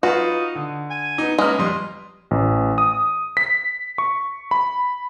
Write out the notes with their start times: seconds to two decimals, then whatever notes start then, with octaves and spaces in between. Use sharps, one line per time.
0.03 F#3 D#4 F4 F#4 B4
0.55 D3
0.90 G#5
1.18 B3 D#4
1.38 G#3 A#3 C#4 B4 F6
1.59 F2 G3 D#5 C6
2.31 A1
2.78 D#6
3.37 B6
3.98 C#6
4.51 B5